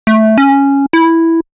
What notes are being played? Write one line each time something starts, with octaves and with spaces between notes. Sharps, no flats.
A3
C#4
E4